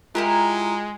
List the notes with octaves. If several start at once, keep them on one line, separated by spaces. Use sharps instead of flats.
G#3 E4 F4 G4 A#4